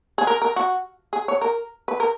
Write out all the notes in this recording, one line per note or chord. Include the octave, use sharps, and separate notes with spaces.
G#4
A#4
A#4
F#4
G#4
C#5
A#4
B4
A#4